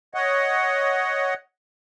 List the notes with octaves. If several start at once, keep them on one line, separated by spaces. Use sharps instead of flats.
C#5 D#5 F#5